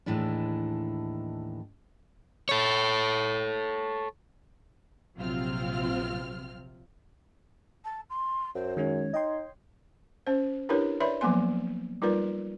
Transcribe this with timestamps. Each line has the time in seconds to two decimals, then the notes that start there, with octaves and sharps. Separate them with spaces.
0.06 D#2 A2 E3 G#3 D4
2.49 A4 C#5
5.16 A#1 C3 F#3 C4 F4 F6
7.85 A5
8.10 C6
8.55 F#2 C5
8.77 D#3 G#3 C#4 C#5
9.14 D#4 D#5 G5 C6
10.27 C#4 C5
10.69 D4 E4 G4 A#4 B4 C#5
11.00 B4 C#5 D5 E5 B5 C6
11.21 F3 F#3 A#3 B3 G#5 C6
12.02 G3 D#4 F4 A#4 B4 D5